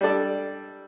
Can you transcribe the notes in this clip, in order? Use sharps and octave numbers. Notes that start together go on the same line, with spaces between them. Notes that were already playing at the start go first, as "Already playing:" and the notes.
G3 D4 A4 D5